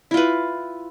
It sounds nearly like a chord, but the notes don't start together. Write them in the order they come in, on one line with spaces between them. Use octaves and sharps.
E4 F4 B4